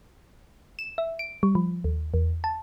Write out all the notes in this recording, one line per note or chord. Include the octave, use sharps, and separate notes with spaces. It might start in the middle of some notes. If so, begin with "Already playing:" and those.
E7
E5
D7
G3
F3
D#2
E2
A5